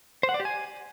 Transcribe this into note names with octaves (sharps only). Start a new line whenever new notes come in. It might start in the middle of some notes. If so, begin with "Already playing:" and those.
C5
F#5
D5
G4
G#5